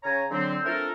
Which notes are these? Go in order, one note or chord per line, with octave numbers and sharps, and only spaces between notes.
C#3 C#5 G#5 A#5
D3 F#3 C4
A3 C4 D4 F4 A4 A#4